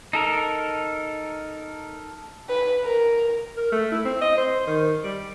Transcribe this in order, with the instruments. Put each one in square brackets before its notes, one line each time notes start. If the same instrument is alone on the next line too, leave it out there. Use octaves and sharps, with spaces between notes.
[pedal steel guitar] D#4 A4 A#4
[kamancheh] B4
A#4
[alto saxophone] A#4
A3
E4
C4
D#5
C5
D#3
G3